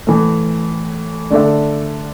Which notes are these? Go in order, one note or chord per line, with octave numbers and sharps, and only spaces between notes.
A2 E3 A3
D3 A3 D4 A4 E5